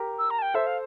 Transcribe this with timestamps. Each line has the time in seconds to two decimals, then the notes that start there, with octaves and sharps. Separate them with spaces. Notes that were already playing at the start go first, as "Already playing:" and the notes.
Already playing: G4 A#4
0.19 E6
0.30 A#5
0.38 A5
0.42 G5
0.54 A4 C5 E5
0.66 F5